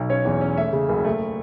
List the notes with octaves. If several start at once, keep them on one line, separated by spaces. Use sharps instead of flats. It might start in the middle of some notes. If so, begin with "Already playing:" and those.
Already playing: B1
C#4 C#5
E2
C#4
A3 E5
C#3
F#1
A3